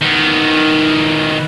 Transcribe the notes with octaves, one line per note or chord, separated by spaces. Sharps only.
D#3 B3